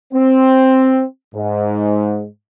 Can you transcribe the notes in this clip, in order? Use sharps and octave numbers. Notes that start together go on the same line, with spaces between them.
C4
G#2